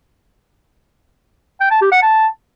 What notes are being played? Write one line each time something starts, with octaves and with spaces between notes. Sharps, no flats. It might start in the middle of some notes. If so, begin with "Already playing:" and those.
G5
A5
G4
F#5
A5